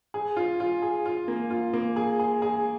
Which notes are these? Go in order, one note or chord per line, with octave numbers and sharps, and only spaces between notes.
G#4
F4
F4
G#4
F4
A#3
F4
A#3
G#4
G#4
G#4